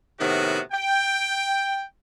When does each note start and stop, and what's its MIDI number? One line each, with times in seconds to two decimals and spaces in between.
0.20 0.59 45
0.20 0.59 48
0.20 0.59 51
0.20 0.59 59
0.20 0.59 66
0.72 1.82 79